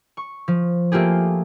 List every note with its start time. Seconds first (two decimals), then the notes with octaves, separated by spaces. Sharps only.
0.17 C#6
0.48 F3
0.92 A3 A#3 F4 G4 G#4